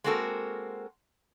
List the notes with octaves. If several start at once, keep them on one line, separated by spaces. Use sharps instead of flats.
G#3 A#3 C4 F#4 A4 A#4